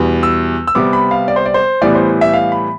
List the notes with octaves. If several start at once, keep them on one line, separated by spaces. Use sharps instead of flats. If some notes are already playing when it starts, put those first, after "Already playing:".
Already playing: E2 B2 G3 B3
E6
E6
C3 G3 B3 D6
B5
F5
D5
C5
D5
C5
A2 E3 G3 B3 D5
C5
E5
F5
B5